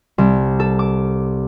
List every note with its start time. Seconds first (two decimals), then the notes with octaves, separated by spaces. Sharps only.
0.18 C2
0.60 A4
0.79 D6